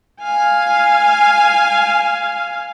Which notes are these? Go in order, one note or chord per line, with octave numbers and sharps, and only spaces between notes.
F5 G#5